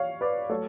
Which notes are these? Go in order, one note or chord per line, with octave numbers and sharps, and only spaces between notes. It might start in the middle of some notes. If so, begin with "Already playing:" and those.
Already playing: C#5 F5
B4 D5
F#3 A3 A4 C#5